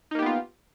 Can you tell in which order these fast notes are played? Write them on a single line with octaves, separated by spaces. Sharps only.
D#4 A#3 G4 B3 F4